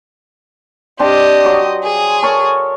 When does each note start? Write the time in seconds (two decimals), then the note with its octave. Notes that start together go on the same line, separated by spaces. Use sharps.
0.99 C4 D4 G4 D#5
1.45 F#3 D#6
1.84 G#4
2.23 A4 A#4 C#5